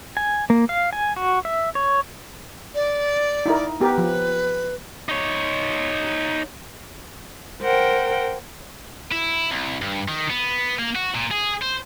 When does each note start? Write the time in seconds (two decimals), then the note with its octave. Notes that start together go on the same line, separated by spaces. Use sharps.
0.17 G#5
0.50 A#3
0.69 F5
0.93 G#5
1.16 F#4
1.45 E5
1.75 C#5
2.75 D5
3.46 D#4 E4 A#4
3.80 B3 G4 A#4 B4
3.98 F3
5.09 D#4 C#5
7.62 A#4 C5 F#5 G5
9.12 E4
9.51 C2
9.82 G2
10.08 D#3
10.30 B3
10.79 A#3
10.95 F#4
11.15 A#2
11.31 G#4
11.62 C5